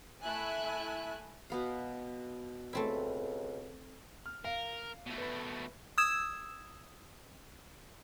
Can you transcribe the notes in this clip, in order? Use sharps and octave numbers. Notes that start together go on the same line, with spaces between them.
A3 E4 E5 G#5 F#6
B2 B3 F5
C#2 A3 C4 E4
F6
A#4 F5
B2 A3
B4 B5
D#6 E6 G#6 E7